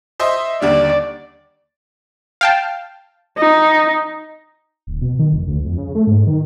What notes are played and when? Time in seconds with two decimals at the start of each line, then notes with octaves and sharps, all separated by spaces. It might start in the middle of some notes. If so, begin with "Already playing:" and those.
0.20 C5 D#5 E5
0.62 D#2 D3 G3 D5
2.41 F5 G5 A5
3.38 D#4
4.87 D1
5.02 B2
5.19 D#3
5.32 F1
5.47 D2
5.65 F2
5.78 C#3
5.95 A3
6.07 G#2
6.27 D#3